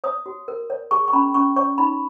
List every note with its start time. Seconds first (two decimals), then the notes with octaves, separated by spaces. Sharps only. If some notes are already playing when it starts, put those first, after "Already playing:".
0.04 C#5 D#6
0.26 F#4
0.48 A#4
0.70 C#5
0.91 G#4 C#6
1.08 C#6
1.13 C#4 B5
1.34 C#4 C#6
1.56 C#5 C#6
1.78 D#4 B5